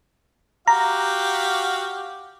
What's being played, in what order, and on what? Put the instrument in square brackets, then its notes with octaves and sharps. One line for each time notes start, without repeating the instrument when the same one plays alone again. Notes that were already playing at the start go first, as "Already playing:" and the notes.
[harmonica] F#4 G4 F5 [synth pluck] A#5